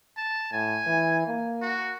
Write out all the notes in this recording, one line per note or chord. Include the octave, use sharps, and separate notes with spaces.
A5
A2 G#5
E3
A#3
F#4